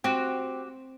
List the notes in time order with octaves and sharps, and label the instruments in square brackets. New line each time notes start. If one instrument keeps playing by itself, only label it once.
[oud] C4 [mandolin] F#4 G4